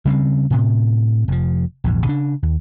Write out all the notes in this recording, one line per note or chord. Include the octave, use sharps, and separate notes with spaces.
C#3 G3 B3 C4
A2 C3
F1 F3
A#1 E2 G#2
C#3 D4
D#2